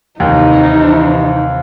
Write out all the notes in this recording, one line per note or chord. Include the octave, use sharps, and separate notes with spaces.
D#2 C3 E3 D#4